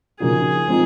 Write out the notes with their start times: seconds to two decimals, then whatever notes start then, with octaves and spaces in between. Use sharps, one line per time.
0.20 C#3 F3 A#3 D#4 F#4 G#4
0.68 F3 G#3 C4 D#4